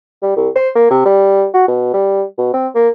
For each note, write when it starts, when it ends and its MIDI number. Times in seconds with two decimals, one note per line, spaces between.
0.22 0.35 55
0.36 0.49 36
0.56 0.70 72
0.75 0.86 58
0.90 1.04 48
1.05 1.46 55
1.54 1.67 66
1.68 1.92 47
1.93 2.23 55
2.38 2.51 47
2.54 2.68 60
2.75 2.89 58